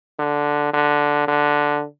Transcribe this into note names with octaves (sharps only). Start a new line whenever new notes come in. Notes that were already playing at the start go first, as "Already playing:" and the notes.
D3
D3
D3